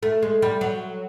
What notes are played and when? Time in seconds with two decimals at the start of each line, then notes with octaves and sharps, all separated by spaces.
0.03 A3
0.23 G#3
0.42 G3
0.61 F#3